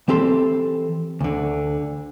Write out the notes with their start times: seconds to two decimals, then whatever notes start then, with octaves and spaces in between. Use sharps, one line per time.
0.08 E3 C4 G4 A4 A#5 C6
1.21 D2 D3